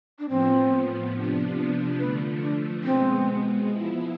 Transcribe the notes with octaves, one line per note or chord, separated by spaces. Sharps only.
D4
A2 F3 B3 C4
C3 F3 B3 D4
D3 F3 A3 B4
D4
B2 G#3 B3 C4
F3 B3 E4